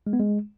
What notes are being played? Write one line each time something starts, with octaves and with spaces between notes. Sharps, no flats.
G#3
B3
G#3